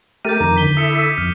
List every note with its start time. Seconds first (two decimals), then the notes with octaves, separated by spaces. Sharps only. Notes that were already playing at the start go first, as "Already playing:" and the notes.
0.25 A3 G4 A#4 G6 A6 D#7
0.40 F2 D#3 A#5 D6
0.57 D3 B6 G7
0.77 E4 A4 E5 D#6 C#7 E7
1.00 B6 D#7
1.18 F2 F6